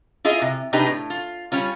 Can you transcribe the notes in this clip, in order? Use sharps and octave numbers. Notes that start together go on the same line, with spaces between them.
E4 F4 G#4 D#5
C3
C3 D4 D#4 G4 B4
A2
F4
G3 C#4 F4